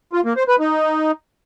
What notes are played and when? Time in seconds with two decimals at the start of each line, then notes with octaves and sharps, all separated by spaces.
0.13 F4
0.25 A#3
0.36 C5
0.48 B4
0.60 D#4